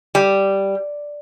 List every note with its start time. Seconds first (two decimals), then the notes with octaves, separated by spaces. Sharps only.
0.15 G3